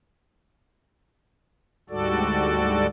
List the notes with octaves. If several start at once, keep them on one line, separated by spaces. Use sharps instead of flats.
D2 G#2 G3 F#4 A4 D5